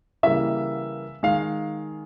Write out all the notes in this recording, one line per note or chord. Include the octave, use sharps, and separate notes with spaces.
C#3 E3 G3 A#3 E5
D#3 G#3 F5